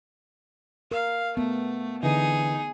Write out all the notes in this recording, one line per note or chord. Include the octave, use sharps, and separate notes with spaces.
A#4 F5
A3 B3
D3 E3 D#4 G#4